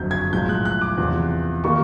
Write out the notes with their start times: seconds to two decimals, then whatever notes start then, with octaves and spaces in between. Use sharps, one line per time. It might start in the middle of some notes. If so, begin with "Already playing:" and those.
Already playing: F#1 F2 D3 F#3 G6
0.11 G#6
0.32 B1 A2 F3 G#3 G6
0.49 F#6
0.65 F#6
0.81 D6
0.98 E2 C3 F3
1.64 D#3 G3 A#3 C#6